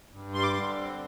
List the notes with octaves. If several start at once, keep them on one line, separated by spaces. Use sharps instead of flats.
G2
G3 C6
D6
C6
D3
C4